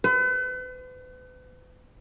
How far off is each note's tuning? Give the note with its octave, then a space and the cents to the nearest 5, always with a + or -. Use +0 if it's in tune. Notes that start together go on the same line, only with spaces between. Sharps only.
B4 +40